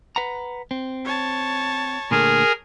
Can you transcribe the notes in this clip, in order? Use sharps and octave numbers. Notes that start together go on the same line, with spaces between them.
B4 F#5 A#5
C4
C#5 A5
A#2 D3 A3 G#4 A#4